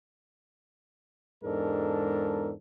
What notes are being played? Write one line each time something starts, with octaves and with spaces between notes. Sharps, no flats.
E2 G#2 G#3 D4 A4 A#4